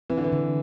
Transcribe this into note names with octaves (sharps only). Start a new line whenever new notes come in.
E3 C4
D3
E3
D3